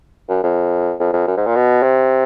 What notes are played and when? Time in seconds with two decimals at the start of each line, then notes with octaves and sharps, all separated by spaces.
0.29 F#2
0.43 F2
1.00 F2
1.13 F2
1.27 F#2
1.37 G#2
1.46 A#2
1.56 B2
1.83 C3